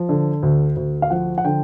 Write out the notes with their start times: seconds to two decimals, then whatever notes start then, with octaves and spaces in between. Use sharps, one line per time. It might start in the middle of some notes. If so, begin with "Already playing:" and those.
Already playing: F3
0.09 D3
0.43 D2
0.76 D2
1.02 F5
1.10 F3 F#5
1.38 F#5
1.45 D3 G5